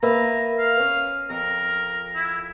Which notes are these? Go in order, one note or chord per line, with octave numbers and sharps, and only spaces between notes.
A#3 B4 E5 A#5
F5
C#4
F2 A#4
E4